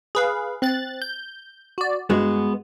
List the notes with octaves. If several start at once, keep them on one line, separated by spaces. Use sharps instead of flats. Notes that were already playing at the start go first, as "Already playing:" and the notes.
G#4 B4 F5
C4 F#6 A6
G6
F#4 D5
G2 G#3 B3 F#4